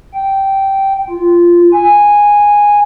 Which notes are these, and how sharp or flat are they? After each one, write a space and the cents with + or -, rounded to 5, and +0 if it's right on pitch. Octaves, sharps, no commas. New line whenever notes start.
G5 -10
F4 -10
G#5 -10